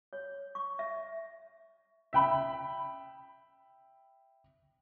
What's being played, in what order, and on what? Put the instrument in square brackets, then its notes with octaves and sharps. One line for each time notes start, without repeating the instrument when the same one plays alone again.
[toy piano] C#5
C#6
E5
[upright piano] E5 G5 B5